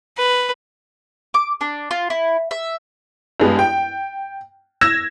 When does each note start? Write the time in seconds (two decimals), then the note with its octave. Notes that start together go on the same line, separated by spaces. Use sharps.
0.18 B4
1.34 D6
1.61 D4
1.91 F4
2.10 E4
2.51 E5
3.40 G2 G#3 B3
3.59 G5
4.81 E6 G#6 A#6 E7